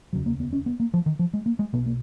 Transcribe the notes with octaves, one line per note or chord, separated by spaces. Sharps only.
F1 D#2 C#3 F#3
A#3
B3
C#4
B3
A#3
F3
D#3
F3
G#3
A#3
G#3
B1 B2 B3
A#3